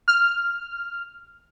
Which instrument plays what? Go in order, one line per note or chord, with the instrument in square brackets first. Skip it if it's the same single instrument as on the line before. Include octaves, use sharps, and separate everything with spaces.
[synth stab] F6